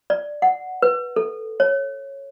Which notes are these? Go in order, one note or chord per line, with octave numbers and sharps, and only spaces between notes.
D5
F#5
B4
A4
C#5